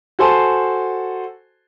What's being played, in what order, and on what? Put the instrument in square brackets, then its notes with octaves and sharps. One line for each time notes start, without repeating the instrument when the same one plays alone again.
[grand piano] F#4 A4 C5 G#5 A5 C6